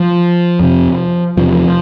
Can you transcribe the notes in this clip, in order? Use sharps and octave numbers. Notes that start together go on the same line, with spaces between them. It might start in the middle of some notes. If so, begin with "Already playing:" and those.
Already playing: F3
F2 C3
E2 C3 F3